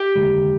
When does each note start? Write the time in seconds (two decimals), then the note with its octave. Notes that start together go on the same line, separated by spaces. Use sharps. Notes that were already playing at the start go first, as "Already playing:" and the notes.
Already playing: G4
0.15 F1 D#2 D3 G#3